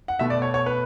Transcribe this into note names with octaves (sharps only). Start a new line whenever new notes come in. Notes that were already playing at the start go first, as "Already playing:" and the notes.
F#5
B2 A3 E5
D5
C#5
C#5
B4